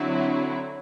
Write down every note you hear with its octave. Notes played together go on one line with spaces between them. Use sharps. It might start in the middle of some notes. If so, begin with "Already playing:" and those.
Already playing: D3 F#3 C4 E4